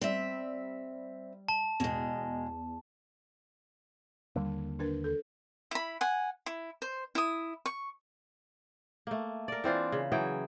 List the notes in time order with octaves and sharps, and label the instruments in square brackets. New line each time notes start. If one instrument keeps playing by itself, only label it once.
[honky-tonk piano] G3 [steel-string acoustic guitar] C4 E5
[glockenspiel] A5
[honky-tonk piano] E2 [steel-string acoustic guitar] B2 G#3
[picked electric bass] D#2 D3 A#3 [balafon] G3
[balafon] D4 A#4 B4
A4
[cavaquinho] E4 B5
F#5 G#5
E4
C5
E4 D#6
C#6
[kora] A3 A#3
A#4 D5
E3 C4 D4 F4
C#3
E3 F#3 G#4 G5